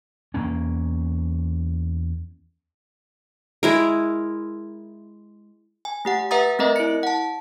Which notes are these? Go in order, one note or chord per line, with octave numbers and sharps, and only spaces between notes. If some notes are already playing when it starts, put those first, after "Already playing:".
E2 A#3 C#4
G#3 E4 A#4
G#5
A3 G4 F#5
B4 E5 F#5 A#5 D#6 A6
A3 C4 A#4 D#5 E5
E4 C#7
F#5 A5